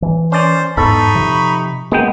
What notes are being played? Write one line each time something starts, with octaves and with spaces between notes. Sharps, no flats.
E3
C#4 C5 D5
E2 G#2 D#4 A4 B5 C#6
C3 F3
G#3 A#3 B3 G5